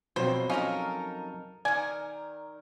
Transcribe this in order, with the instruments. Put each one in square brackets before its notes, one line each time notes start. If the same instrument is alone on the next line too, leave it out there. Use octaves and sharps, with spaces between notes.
[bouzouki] B2 [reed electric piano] F3 F#3 C4 [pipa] C5
[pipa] C#4 F4 [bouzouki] D#4 A4 A#4
[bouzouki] D#3 A#4 [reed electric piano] D5 [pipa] G#5